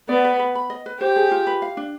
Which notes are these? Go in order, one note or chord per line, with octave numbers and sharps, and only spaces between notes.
B3 D5
B4
B4
B5
D#5
B4
G4 C5
G#4
F4
B4
F5
D4